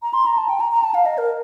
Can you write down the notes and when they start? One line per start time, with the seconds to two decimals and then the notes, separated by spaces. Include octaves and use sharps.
0.02 A#5
0.13 C6
0.26 A#5
0.37 A5
0.49 G5
0.60 A#5
0.72 A#5
0.83 A5
0.94 F5
1.05 D#5
1.18 A#4